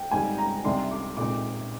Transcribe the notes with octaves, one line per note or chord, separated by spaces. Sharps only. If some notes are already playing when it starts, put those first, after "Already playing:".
Already playing: G5
G#1 G#2 D#3 G3 G#5
A#5
C2 C3 D#3 G3 D4 C6
D6
A#2 G#3 C4 D#4 D6